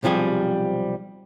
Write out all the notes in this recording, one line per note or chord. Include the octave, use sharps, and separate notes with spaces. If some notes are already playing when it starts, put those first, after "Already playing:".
B1 C3 F3 G3 G#4